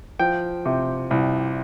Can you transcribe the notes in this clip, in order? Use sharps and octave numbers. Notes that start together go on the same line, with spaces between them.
F3 G5
C3
C2